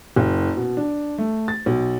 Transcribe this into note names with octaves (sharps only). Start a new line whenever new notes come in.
F#1
B2
D4
A3
A6
B1